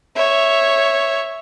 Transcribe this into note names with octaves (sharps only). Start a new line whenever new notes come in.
C#5 E5